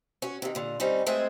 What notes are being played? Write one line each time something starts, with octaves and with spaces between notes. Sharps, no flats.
C#4 F#4
C3 D#3
A#2 D3
G3 C4 C#4 D#4
G#3 A3 C4 G#4